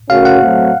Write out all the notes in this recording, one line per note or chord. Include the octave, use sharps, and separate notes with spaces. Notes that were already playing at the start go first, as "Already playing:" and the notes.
C#3 A3 C#4 F#4 A#4 F5
F#5
F#3 A3 C4